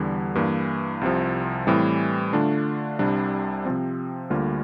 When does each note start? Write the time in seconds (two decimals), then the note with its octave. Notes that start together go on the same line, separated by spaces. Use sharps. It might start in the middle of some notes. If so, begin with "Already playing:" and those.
Already playing: E2 D3 G3
0.35 G2 E3 A#3
1.01 C2 C3 F3
1.67 A2 E3 G3 C4
2.33 D3 A3 D4 F4
2.99 C2 C3 G3 D4
3.65 C3 F3 C4
4.30 D2 D3 G3 A#3 F4